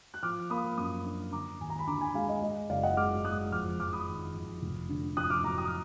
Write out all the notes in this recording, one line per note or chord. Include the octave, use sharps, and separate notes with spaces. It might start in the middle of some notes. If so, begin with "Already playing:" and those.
F#6
F3 D6 F6
A#3 B5 D#6
F#2 B5 D#6
D4
D3 A#5 D6
D#2 G#5
A#5
B5
D3 A#5 D6
G#5 B5
G#3 F5 G#5
D#5
G#3 D#5
F#1 D5 F5
D#5 F#5
G#3 D6 F6
G#3 D#6 F#6
F2 D6 F6
F2 D6 F6
B5 D#6
D#3
F2
F1
D3
F2 D#6 F#6
D6 F6
F#3 A#5 D6
D#6
F6